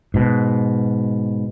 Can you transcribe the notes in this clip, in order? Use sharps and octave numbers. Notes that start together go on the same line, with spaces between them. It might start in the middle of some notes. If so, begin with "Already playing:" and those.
G#2 B2